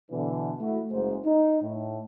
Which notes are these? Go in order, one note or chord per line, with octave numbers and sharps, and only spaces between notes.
B2 D3 E3
A3 E4 F#4
F#1 G#2 C5
D#4
A2